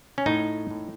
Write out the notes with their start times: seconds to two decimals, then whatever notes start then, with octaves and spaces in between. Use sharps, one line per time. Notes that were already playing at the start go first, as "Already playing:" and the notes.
0.18 C#4
0.26 A2 D#4
0.70 A2